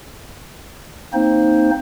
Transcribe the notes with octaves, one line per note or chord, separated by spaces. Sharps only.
A#3 C4 D#4 C5